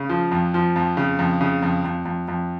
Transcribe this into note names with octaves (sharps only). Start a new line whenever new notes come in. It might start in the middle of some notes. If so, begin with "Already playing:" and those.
Already playing: C#3
F3
F2
F3
F2
C#3
F2
C#3
F2
F2
F2
F2